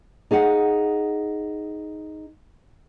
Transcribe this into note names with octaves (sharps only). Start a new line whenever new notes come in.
D#4 G#4 F5 F#5